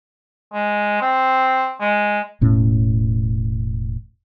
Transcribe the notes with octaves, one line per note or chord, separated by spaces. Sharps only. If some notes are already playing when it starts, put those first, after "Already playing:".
G#3
C4
G#3
E1 A2 C#4